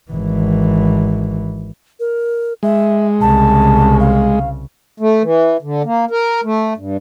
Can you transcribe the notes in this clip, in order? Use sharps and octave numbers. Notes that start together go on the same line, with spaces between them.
G#1 E3
A#4
G#3 E5
C2 C#3 A5
F5
A3
E3
D3
A#3
A#4
A3
G2